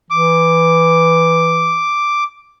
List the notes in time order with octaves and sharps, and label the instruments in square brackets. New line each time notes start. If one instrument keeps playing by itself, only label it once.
[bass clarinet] E3 [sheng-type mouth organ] D6